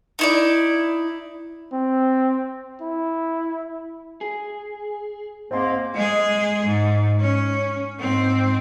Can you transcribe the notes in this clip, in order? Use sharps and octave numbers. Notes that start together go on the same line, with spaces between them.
D#4 E4 D5
C4
E4
G#4
G#2 A#3 C4 C6
G#3 G#4
G#2
C#4
G#2 C4